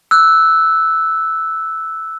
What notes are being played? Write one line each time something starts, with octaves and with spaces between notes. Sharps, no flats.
E6 F#6